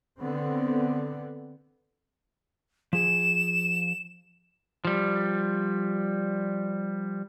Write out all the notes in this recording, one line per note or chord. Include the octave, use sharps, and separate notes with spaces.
D3 B3 C4
F3 G#4 E7
F3 G3